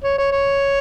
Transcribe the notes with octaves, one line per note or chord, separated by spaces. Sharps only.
C#5
C#5
C#5